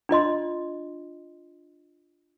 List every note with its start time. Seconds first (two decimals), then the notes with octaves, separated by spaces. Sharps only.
0.09 D4 F4 D#5 C6